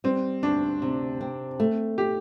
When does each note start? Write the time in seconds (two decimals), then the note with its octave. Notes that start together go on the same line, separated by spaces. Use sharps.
0.04 G3 C4
0.43 D2 D4
0.82 C3
1.21 C4
1.60 A3
1.98 G4